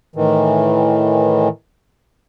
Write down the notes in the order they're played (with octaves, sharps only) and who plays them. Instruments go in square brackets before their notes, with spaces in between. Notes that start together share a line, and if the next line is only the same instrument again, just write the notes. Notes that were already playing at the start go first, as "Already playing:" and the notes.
[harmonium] A2 D#3 E3